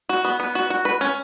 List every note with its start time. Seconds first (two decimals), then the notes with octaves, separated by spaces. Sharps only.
0.09 F#4
0.25 B3
0.40 B3
0.55 F#4
0.70 F#4
0.85 B4
1.01 C#4